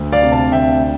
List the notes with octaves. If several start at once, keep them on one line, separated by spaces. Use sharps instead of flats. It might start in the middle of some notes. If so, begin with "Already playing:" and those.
Already playing: D2
D5 F5
C3
F5 A5
D2 E5 G5